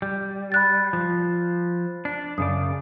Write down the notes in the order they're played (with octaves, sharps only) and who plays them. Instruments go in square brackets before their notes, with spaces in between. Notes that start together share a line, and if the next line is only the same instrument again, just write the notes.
[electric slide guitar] G3
[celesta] B5 F#6 A6
[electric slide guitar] F3
D4
[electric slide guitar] F#2 C#3 D5 [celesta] D#6